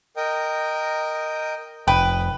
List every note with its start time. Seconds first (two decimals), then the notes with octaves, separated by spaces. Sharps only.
0.16 A#4 D#5 G5
1.88 F1 B4 G5 D#6